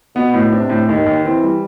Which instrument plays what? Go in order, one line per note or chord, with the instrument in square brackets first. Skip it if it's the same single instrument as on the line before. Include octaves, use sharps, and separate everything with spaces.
[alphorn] B2 [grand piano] B3
[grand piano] A2
[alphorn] C3 [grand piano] D4
[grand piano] A2
[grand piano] D#2 [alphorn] D#3
[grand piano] D#2
[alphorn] E3 [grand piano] C4
[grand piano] G3